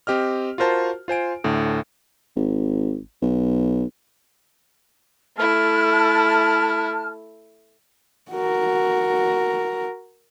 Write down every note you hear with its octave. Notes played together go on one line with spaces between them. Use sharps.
C4 G4 D#5 F6
F4 F#4 A#4 C5 A5
F4 C5 G#5 D7
D2 A2 D3
G#1
B1
A3 E4 A5 F6
F#4 A#4